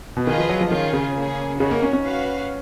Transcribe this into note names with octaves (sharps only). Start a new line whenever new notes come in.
B2
D#3 F4 G#4 B4 D#5
F3
F#3
F3
D#3 C#4 F4 G#4
C#3
A#3 C#4 G#4
C#3 D#4 F#4 A#4 C#5
A#3
C#4
C#4
F#4 B4 F5